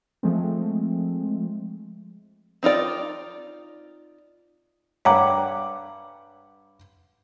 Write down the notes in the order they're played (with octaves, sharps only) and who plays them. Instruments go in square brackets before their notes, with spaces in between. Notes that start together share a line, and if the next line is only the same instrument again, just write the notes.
[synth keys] F3 G#3 A3 C4
[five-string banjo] C4 D#4 F4 D5
[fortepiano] G2 F#5 D6 [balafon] C#5 G5 A#5